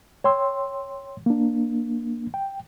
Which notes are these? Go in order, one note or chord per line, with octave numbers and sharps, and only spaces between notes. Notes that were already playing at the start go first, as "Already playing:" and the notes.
C#5 G5 C6 E6
A#3 D4
G5